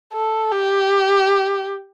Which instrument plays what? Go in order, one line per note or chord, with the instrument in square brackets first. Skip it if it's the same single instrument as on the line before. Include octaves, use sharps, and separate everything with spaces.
[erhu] A4
G4